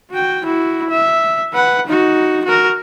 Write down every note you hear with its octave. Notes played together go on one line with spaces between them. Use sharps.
F#4 G5
E4 F#4
E5
B4 F#5
D#4 F#4
F#4 A#4